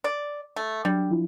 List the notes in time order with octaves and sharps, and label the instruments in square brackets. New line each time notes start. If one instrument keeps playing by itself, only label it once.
[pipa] D5
A3
[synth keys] F#3 D4 [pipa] G3
[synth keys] F3 E4 F4